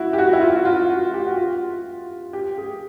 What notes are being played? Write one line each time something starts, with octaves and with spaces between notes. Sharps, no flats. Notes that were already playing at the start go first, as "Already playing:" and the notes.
Already playing: E4 F#4
G4
F#4
E4
F4
F#4
F4
F#4
G4
F#4
F4
G4
G#4